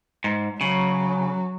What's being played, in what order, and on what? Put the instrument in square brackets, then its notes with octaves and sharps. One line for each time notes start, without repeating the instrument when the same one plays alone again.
[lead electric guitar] G#2
[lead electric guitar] C#3 [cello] F#3